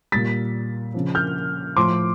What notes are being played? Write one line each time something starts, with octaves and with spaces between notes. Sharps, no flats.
A#2 G3 A6 B6
C#3 F3
F6 G6
A2 F3 C6 D6